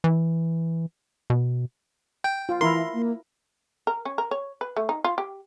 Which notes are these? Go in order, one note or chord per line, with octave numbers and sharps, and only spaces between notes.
E3
B2
G5
F4
E3 E4 A#4 C6
A#3
A#4
C#4
A#4
C#5
B4
A3
D#4
F4
G4